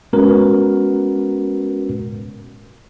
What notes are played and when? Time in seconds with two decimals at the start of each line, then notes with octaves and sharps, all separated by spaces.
0.13 G#3 B3 C#4 F#4 A#4 B4